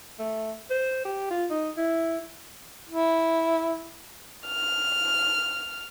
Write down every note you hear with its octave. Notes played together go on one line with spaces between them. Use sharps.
A3
C5
G4
F4
D#4
E4
E4
F6